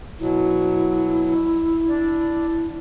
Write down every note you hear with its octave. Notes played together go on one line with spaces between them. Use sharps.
B2 F#3 E4
D4 D5